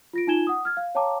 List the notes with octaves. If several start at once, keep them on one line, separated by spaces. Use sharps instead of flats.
F4 A#6 D7
D#4 F4 G#5 G#6 E7 G7
F#5 D#6
F6 G#6
F5
C#5 F5 G5 A5 A#5 D6